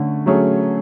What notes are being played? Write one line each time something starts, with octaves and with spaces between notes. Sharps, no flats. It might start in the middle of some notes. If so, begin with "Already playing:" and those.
Already playing: D3 A3 C#4
F#3 A3 C#4 G#4